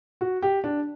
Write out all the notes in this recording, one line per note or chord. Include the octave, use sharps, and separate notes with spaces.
F#4
G4
D4